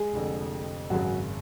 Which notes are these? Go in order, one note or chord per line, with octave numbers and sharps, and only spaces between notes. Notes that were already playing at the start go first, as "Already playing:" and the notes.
Already playing: G#3 G#4
F1 F2 D3
G#1 F#2 C#3 F#3 F#4